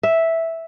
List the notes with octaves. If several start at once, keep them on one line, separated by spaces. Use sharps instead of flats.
E5